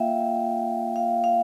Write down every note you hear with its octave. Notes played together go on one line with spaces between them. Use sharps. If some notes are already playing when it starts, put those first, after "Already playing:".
Already playing: A#3 F4 E5 F5 G5
F5
F5